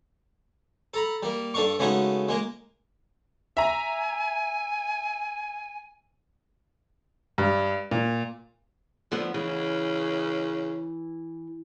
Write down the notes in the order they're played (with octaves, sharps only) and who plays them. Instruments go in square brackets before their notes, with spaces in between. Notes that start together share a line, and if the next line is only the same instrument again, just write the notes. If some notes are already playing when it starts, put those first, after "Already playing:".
[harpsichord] A4 A#5 B5
G3 A#3
G2 D4 A4 F5 C#6
C#3 G#3 A3 B3 D#4 F#4
G#3 A#3 A#4
[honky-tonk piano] E5 A#5 [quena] G#5
[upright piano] G2
A#2
[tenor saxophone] D3 [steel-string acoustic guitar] F3 B3
[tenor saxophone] C#3 [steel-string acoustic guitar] E3